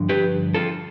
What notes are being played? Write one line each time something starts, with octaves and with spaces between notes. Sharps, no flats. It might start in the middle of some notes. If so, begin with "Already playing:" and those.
Already playing: G2 D3 F3
G4 B4
F4 A4